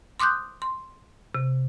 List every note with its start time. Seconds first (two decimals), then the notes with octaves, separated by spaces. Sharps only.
0.20 C6 D6 D#6 F#6 G6
0.62 C6
1.35 C3